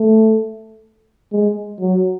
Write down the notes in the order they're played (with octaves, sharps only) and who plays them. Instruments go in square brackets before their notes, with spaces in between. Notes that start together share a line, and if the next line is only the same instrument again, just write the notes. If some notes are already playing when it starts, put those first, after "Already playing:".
Already playing: [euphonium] A3
G#3
F#3